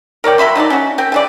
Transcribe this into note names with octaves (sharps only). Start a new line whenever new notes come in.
A#4 C#5 D5 G5
F#3 E5 B5 C6
F#3 D#4 A4 D5
C#4 F#4
C4 G5
C#3 E3 D5